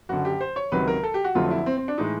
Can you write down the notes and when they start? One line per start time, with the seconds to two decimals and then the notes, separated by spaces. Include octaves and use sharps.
0.09 F#1 F#2 D3 F#4
0.25 G4
0.41 C5
0.56 C#5
0.72 C#2 C3 D#3 F#3 B4
0.88 A#4
1.03 A4
1.14 G4
1.24 F#4
1.35 F1 F2 D3 F#3 A3 F4
1.51 E4
1.66 C4
1.77 C4
1.88 D4
1.98 A2 E3 G#3 D#4